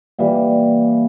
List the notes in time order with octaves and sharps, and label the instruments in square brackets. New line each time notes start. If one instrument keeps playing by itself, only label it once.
[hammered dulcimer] A#2 E3 G3